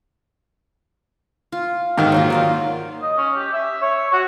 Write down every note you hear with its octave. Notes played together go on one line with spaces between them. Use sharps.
F4
G#2 D#3 G4 A4 F5
F#3 A#3 F4
D#4 F4 D5
D#5
C#4
G4
E5
C#5
F#4